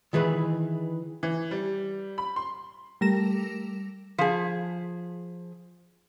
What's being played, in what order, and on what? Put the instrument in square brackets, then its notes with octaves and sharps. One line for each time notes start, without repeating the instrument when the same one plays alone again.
[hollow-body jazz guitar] D#3 E3 G#4 B4
[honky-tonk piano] E3
G3
B5
C6
[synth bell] G3 A3 A#4 A#6 E7
[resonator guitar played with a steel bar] F3 G#4